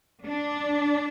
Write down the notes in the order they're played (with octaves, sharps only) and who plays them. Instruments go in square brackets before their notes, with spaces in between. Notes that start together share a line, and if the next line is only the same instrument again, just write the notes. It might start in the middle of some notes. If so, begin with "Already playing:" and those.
[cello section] D4